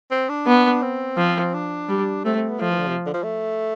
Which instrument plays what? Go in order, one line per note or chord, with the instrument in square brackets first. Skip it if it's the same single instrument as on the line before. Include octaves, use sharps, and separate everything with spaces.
[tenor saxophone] C4
D4
[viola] B3
[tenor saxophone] C4
[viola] F3
[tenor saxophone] D4
[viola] G3
[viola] A3 [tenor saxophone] C4
[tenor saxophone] C4
B3
[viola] F3 [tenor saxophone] A3
[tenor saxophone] E3
D3
C3
D3
F3
A3